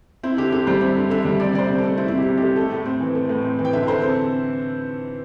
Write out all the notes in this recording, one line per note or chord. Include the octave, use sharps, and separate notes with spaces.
C4 E4
D3 G4
D3 G4
G3 C5
C4 E5
D3
D3 E5
G3
C4 D5
C3 C5 D5
C3
A4
A3
C4 E4
C3 E4
G4
C3
A3 G4
A3 A4
A2
C4
E3
A3
A2
C4
E3
G5
D3 E5
D3 C5
C4 A4